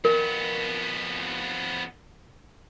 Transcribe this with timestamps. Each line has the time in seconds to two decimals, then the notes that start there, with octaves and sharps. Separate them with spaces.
0.05 F2 B3 A#4